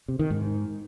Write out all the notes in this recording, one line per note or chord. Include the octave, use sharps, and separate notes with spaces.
C3
D#3
G#2